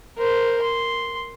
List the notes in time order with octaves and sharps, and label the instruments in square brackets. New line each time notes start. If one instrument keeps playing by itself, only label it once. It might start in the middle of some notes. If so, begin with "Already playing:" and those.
[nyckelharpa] A#4 C5
C6